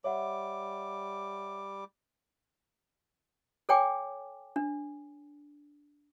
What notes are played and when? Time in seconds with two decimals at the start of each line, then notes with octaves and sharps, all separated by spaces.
0.04 G3 C#5 E5 F#5 D6
3.69 A4 C#5 G5 G#5 D6
4.56 D4